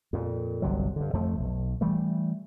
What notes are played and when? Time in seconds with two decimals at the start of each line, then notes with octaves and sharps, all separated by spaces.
0.13 F2 A#2
0.62 G1 C2 C3 F#3
0.96 G2 D3
1.13 F2 F3 A3
1.40 B1
1.81 E3 G3 A3